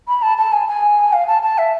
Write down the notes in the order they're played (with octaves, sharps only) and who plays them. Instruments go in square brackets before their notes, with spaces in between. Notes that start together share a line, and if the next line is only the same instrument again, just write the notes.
[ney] B5
A5
A5
G#5
G#5
F5
A5
A5
E5